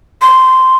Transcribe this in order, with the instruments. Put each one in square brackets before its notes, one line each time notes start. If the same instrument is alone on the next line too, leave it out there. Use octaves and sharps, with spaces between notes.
[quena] C6